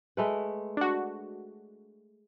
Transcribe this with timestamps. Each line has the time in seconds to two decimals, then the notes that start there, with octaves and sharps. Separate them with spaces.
0.17 G#3 A3 B4
0.77 D4 F#4